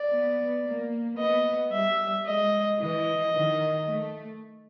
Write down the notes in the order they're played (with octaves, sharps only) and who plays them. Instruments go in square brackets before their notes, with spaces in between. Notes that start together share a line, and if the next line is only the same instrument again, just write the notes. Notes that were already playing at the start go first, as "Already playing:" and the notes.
Already playing: [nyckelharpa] D5
[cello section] B3
A#3
[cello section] B3 [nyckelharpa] D#5
[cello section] G3 [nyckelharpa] E5
[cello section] G#3 [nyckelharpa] D#5
[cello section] E3 [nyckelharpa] D#5
[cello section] D#3
A3